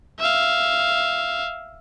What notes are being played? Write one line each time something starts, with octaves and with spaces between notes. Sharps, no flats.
E5 F5